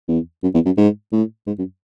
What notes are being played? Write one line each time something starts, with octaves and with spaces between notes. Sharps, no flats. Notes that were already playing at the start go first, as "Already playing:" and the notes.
E2
F#2
E2
F#2
G#2
A2
G#2
F#2